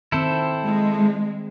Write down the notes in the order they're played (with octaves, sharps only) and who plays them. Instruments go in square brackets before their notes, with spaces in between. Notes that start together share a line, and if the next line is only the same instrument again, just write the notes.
[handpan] D#3 C4 [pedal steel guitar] E4 A4 C5
[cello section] G#3